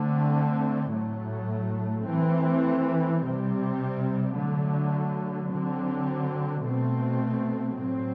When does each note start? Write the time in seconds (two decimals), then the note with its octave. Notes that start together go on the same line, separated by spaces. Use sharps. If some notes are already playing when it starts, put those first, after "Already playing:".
Already playing: D3 A3 C4
0.93 A2 F#3 A3
2.07 E3 A3 C4
3.21 C3 G3 C4
4.36 D3 F#3 A3
5.49 D3 F#3 C4
6.64 B2 A3 C4
7.77 A2 F#3 C4